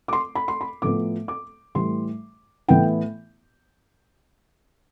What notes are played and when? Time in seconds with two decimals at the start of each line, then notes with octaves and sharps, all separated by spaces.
0.08 D6
0.13 C6
0.35 B5
0.48 C6
0.61 B5
0.82 A2 F3 B3 D6
1.28 D6
1.75 A2 E3 G3 C6
2.68 A2 E3 B3 E4 G5